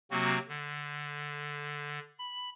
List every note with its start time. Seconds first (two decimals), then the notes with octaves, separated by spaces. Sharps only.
0.11 C3 F#3 A#3 C4 F#4
0.48 D3
2.19 B5